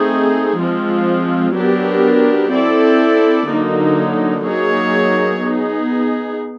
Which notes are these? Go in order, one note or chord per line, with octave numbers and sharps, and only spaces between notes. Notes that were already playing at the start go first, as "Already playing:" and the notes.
Already playing: A3 C4 D#4 G#4
F3 G#3 C4 F4
F#3 B3 D4 G4 A#4
C4 E4 A4 D5
D3 F#3 A#3 D#4
F#3 A#3 D#4 G#4 C#5
B3 D#4 G#4